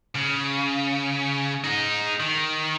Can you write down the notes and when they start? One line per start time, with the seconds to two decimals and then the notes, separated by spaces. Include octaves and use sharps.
0.15 C#3
1.64 D#4 G#4
2.20 D#3